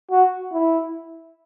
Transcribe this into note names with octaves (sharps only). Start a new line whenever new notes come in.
F#4
E4